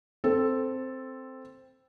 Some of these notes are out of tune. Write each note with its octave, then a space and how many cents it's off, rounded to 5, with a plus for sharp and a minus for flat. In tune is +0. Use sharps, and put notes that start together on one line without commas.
C4 +0 A4 +0